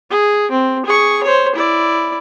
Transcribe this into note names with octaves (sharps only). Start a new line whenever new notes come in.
G#4
C4
G#4 C#6
C5 C#5
E4 D5